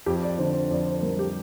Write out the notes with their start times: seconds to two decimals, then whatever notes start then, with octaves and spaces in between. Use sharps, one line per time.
0.06 F2 G4
0.23 D5
0.38 D3 C5
0.54 C5
0.71 F2 D5
0.87 C5
1.03 G3 A#4
1.19 G4